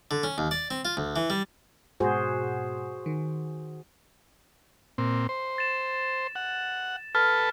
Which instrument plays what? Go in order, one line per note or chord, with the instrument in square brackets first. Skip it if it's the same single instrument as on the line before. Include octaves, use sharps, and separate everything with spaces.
[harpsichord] D3
C#4
D#2
D5
C4
F4
D2
E3
G3
[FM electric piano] G#2 B2 [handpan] F#4 G#4 C5
[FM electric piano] D#3
[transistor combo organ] A#2 C4
C5
[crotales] A6 E7
[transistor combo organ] F#5
[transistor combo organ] A4 B4 A5 [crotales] F6